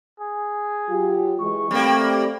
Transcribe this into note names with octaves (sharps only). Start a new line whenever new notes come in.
G#4
F#3 F4 G4
E3 G#3 C#6
G3 A3 A#3 C4